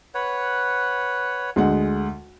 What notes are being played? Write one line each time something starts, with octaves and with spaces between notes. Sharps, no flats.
B4 C#5 F#5
D2 G#3 F#5